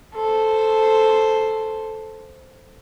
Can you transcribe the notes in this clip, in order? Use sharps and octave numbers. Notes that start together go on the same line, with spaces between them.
A4 C5